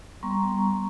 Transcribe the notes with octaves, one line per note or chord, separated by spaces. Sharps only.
G3 B3 A#5 C6 C#6